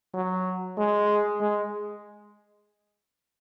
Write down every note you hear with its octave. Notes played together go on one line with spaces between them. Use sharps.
F#3
G#3
G#3